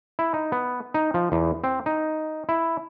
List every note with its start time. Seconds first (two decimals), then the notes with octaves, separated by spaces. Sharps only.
0.19 E4
0.34 D#4
0.52 B3
0.94 D#4
1.14 F3
1.32 E2
1.64 C4
1.86 D#4
2.49 E4